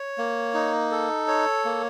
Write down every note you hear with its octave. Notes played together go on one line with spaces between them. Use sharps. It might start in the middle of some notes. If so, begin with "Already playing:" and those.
Already playing: C#5
A#3
D#4
A4
C#5
A#3